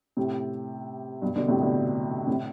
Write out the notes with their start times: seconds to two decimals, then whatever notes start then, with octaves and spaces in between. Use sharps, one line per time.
0.17 A2 C3
1.22 G2 B2
1.36 B2 D3
1.48 A2 C3
1.61 B2 D3
2.27 A2 C3